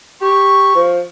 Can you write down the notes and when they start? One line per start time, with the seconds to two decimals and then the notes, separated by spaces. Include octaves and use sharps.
0.22 G4 C#6
0.75 F3